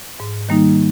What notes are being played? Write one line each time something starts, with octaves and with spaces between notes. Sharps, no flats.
G#2
D#3 G3 A#3 D#4